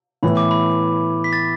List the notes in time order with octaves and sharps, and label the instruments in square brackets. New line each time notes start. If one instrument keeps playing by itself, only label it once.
[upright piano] A2 E3 B3 E4 [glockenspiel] B5
[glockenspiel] D6
B5
B6
A6